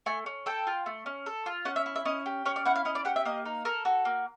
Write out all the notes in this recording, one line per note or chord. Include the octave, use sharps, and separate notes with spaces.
A3 G#5
C#4
A4 G5
F4
A3
C#4
A4
F4
C#4 F#5
E5
E4
E5
C#4 D#5
G4
C#4 C#5
D5
E4 F#5
F5
C#4 D#5
D5
G4 F#5
E5
A#3 D#5
D#4
A4 A#4
F#4
A#3